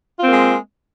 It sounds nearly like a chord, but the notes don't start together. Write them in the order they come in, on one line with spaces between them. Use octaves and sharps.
F4 C4 A#3 G#3